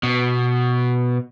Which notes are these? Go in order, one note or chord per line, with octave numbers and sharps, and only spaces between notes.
B2